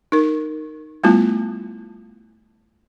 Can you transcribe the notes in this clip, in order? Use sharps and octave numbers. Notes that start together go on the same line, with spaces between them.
D#4 A#4
G3 A3 B3 E4 F4